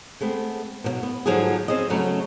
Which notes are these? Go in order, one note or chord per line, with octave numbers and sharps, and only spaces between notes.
G#3 A3 B3 C4
B2 F3 F#3
B3
G#2 D3 F3 F#3 G#3 G#4
C4 C#4 G#4 D#5
C#3 F#3 A3 C#4